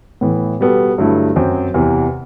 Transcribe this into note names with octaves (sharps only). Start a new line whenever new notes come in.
A2 E3 B3
B2 G3 B3 F#4 A4
G2 D3 F#3 A3 E4
F#2 F#3 C4
E2 C3 E3